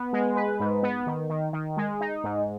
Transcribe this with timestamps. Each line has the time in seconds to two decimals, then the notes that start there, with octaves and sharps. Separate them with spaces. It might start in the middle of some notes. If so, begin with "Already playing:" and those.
Already playing: B3
0.13 G#3
0.36 B4
0.60 G#2
0.83 B3
1.07 D#3
1.30 D#3
1.53 D#3
1.77 G#3
2.00 D#4
2.24 G#2